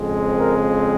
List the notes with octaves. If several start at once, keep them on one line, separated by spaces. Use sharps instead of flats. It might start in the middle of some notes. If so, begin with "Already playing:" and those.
Already playing: F2 C#3 G#3 C4
A#4